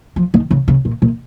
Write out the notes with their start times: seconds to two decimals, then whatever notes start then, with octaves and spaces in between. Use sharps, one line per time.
0.16 F3
0.34 D#3
0.51 C#3
0.68 C#3
0.85 A#2
1.02 A#2